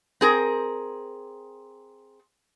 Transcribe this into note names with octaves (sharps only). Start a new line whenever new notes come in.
C4 G#4 A#4